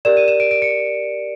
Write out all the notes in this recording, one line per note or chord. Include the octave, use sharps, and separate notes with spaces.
G4 A#4 D5 E7
D#7
E7
D7
D7
C#7